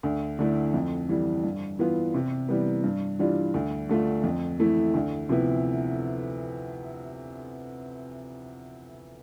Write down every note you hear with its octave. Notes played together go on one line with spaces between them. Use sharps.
D2
D3 A3 E4
F2
E3 G3
G2
E3 B3 F4
C3
E3 G3 B3
G2
E3 G3 D4 F4
D2
D3 A3 D4 F4
F2
E3 A3 E4
D2
C3 F3 B3 E4